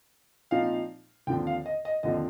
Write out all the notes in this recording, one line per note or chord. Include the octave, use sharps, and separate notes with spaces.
A#2 F3 C4 D#4 F5
D#2 D3 F3 C4 G5
F5
D#5
D#5
D#2 D3 F3 C4 D#5